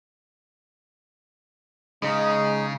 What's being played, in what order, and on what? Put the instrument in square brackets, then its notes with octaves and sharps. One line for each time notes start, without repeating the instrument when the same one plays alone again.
[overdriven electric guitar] C#3 [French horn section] G#3 [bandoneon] D#4 [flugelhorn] D#5